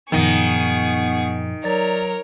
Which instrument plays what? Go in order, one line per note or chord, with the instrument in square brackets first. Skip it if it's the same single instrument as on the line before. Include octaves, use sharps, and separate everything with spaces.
[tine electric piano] F#2 A#2 F3 [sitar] D#3 [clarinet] B3 [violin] G#4 C#6
[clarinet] F#3 [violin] A#4 C#5 [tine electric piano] D5 A6